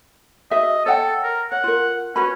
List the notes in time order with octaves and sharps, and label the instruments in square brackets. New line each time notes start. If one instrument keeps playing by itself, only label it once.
[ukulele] F#4 G#4 E5 [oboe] D#5
[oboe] A4 [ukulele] C#5 F#5 G5
[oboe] A#4
[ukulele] C#5 [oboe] F#5
[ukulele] F4 A#4
[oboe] C#4 [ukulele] F#4 B4 B5